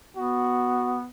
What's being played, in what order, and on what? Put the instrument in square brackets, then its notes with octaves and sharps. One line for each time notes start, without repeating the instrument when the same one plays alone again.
[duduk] B3 [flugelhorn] F#4